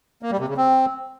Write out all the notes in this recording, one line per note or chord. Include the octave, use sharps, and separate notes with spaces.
A#3
G3
C3
C#3
C4